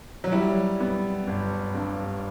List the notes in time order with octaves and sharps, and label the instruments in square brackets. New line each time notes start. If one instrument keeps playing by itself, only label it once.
[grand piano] F#3
[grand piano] G3 [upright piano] E4
[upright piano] B3
G1
G2